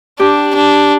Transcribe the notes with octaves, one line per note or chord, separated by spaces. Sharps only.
D4 G4
D4